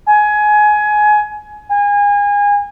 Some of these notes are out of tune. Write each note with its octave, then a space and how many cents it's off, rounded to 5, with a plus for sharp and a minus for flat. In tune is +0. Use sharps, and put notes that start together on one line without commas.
G#5 +20
G#5 -30